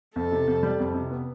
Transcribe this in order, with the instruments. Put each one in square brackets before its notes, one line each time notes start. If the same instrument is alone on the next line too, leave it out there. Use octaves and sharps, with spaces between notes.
[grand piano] F2 [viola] A4
[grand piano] C3
F2
G3
F2
C3
B3